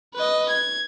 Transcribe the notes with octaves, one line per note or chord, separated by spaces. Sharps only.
B4 D#5
G#6